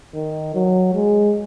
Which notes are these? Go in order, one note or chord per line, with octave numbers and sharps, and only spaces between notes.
D#3
F#3
G#3